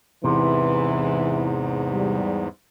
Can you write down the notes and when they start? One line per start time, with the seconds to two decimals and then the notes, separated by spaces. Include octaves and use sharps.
0.24 E2 G#2 C3 E3
1.91 G3